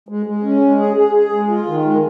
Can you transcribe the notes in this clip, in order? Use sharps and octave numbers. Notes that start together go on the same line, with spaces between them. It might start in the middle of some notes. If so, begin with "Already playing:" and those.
G#3
G#3
C#4
G#3
G#4
G#4
G#4
G#3
F4
D#3
G#3